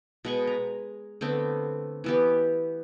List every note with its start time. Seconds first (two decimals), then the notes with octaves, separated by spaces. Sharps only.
0.25 B2 G#3 C#6
0.47 A#5
1.21 D3 A3 B3 C4
2.04 E3 B3 G4